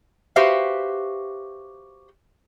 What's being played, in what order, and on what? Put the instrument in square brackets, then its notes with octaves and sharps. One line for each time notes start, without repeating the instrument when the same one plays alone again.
[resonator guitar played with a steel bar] F#4 G4 B4 C5 E5 F5